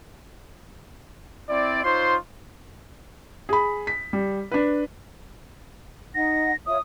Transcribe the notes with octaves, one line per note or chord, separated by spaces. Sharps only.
C4 E4 D5
D#4 F4 C5 C#5 C6
G#4 B5
B6
G3
D4 B4
D#4 F#5 A#6
F4 C#5 E5 D#6